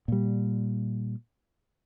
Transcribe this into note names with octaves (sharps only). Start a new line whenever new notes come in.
A#2 G3